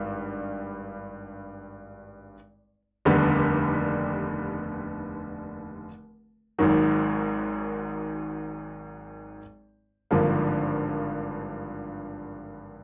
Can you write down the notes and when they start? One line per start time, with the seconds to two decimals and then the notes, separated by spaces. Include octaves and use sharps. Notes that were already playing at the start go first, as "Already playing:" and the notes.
Already playing: G#1 G2 G3
3.05 F1 D#2 D3 G3 B3
6.59 G#1 G#2 D#3 F#3
10.11 G#1 G2 D3 F3 A#3